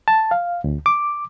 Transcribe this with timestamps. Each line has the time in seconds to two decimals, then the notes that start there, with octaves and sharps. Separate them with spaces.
0.08 A5
0.31 F5
0.64 D2
0.86 D6